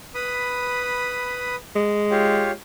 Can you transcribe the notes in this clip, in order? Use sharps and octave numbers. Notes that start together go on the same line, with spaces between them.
B4 B5 D#6
G#3
F4 G4 C#5